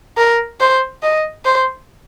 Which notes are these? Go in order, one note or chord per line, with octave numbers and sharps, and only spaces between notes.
A#4
C5
D#5
C5